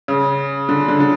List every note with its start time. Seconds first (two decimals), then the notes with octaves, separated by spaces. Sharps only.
0.08 C#3
0.69 D3
0.88 D3
1.00 D3